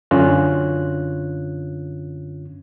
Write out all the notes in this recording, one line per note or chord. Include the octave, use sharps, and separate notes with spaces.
F#2 D3 C#4 F4 F#6